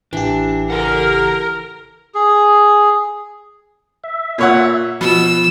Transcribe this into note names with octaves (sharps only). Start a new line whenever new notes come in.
A1 E3 D4 G4
A4 A#4 F#5
G#4
E5
A#2 C#5 F#5
B2 F3 E6